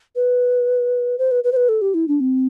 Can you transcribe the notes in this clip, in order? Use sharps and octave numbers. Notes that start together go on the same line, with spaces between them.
B4
C5
B4
B4
C5
B4
A4
G4
E4
D4
C4